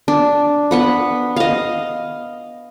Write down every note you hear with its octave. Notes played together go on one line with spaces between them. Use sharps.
D4
B3 F#5 B5
D#5 F5